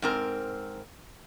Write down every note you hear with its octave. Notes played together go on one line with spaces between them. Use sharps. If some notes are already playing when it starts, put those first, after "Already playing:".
G#2 C4 A#4